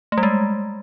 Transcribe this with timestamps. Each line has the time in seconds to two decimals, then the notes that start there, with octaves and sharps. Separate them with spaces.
0.12 A3
0.18 G3
0.23 G#3